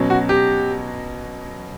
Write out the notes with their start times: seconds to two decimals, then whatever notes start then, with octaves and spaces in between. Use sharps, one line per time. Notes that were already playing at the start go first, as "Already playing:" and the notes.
Already playing: B2 F#3 C#4
0.10 F#4
0.29 G4